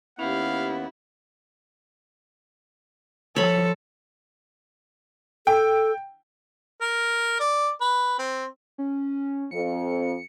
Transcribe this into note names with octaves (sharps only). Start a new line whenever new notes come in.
D#2 B3 C#4 E4 G4 F5
F3 A4 C#5 B5
A4 G5
A#4
D5
B4
C4
C#4
F2 C#7